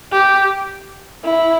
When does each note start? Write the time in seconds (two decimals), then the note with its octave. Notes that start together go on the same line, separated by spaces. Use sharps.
0.13 G4
1.25 E4